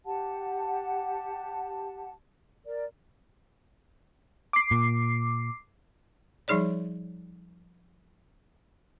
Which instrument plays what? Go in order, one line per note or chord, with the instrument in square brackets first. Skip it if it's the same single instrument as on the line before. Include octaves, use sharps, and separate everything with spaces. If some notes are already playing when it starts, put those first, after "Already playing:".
[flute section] G4 F#5 A5
A#4 D5
[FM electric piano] D6 C7
[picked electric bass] A#2
[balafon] F3 G3 D#4 G#4 C#5 D5